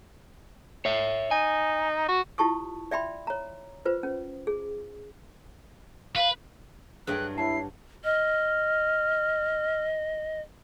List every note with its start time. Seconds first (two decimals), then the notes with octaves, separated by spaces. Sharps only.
0.85 C#5 E5
1.31 D#4 G#5
2.09 F#4
2.38 E4 F4 G4 A5 C#6 D#6
2.91 D5 E5 G5 B5 C6
3.27 C#5 A#5
3.85 F4 B4 C5
4.03 C#4
4.47 G#4
6.16 B4 F5
7.07 G2 F#3 G#4 D5 E5 G5 F#6
7.38 E4 C#5 A5 C7
8.04 D#5 F6